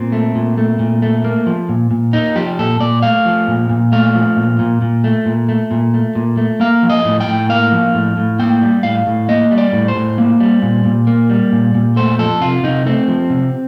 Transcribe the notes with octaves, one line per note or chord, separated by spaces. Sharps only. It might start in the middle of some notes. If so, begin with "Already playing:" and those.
Already playing: A#2 C4
A3
A#2
A3
A#2
A3
A#3
F3
A#2
A#2
A#3 D#4
F3 G4
A#2 A4
A#2 D5
A3 F5
F3
A#2
A#2
A3 F5
F3
A#2
A#2
A#2
A3
A#2
A3
A#2
A3
A#2
A3
A#3 F5
F3
D#5
A2
G5
A2
A#3 F5
F3
A2
A2
A#3 G5
G3
A2 F5
A2
A#3 D#5
G3
D5
A2
C5
A2
A#3
G3
A#2
A#2
A#3
G3
A#2
A#2
A3 C5
F3 A4
C3 F4
C3 D#4
A3 C4
F3
C3